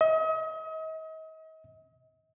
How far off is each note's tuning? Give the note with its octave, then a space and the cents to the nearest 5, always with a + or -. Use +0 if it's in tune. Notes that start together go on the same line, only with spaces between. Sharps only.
D#5 +40